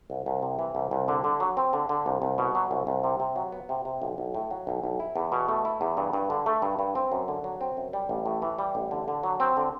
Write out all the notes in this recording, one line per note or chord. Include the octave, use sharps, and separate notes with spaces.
C2
C2
C3
E3
C2
C2
D3
D3
F#3
C4
D3
D3
C2
C2
B2
F#3
C2
C2
C3
C3
F#3
B3
C3
C3
B1
B1
A2
F#3
B1
B1
E4
E2
B2
A3
E4
E2
G2
G2
D3
A3
G2
G2
C4
F#2
D3
F#3
C4
F#2
G3
A1
A2
E3
G3
A1
D3
D3
F#3
C4
D3